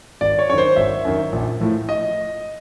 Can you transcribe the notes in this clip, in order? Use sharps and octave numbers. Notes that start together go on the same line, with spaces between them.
G#1 D5
C#5
F#2 D#3 C5 C#5
G#1 E5
F#2 D#3
A#1
A2 F3
D#5